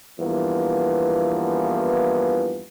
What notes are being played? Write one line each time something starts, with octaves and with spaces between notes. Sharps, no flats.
E2 G2 E3 F3 A#3 B3